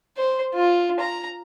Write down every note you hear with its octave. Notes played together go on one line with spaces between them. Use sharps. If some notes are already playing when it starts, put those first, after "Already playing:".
C5
F4
A#5